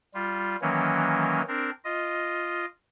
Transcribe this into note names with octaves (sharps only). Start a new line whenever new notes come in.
G3 F4
D#3 E3 F#3 A#3 C#4
C4 D4 A#4
F4 D#5